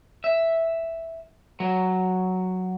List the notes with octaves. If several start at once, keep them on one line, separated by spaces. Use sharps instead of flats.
E5
F#3